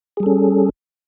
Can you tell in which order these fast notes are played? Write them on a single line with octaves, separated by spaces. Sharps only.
G#4 G3 A4 C#4